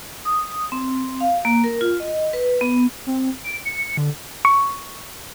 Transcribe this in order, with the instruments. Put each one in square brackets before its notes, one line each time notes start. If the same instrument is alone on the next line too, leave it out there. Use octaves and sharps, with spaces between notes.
[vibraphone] D#6
C4
F5
A#3
A#4
F4
D#5
B4
B3
[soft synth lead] C4
D7
C#7
D3
[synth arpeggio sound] C#6